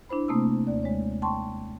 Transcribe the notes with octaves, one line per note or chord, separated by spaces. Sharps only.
D4 E4 C5 B5
C3 A3 A#3 C4 D#6 E6
D#2 D5
G#3 C#5
G5 A5 C6 C#6